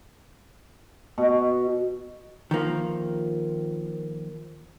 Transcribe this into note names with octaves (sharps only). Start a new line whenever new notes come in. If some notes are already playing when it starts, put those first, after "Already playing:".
B2
D#3 F3 A#3